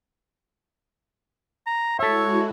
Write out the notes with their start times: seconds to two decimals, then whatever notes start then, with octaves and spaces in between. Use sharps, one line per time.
1.67 A#5
1.99 G#3 E4 F#4 A4 C#5 E5